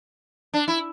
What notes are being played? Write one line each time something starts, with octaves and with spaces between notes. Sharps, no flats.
D4
E4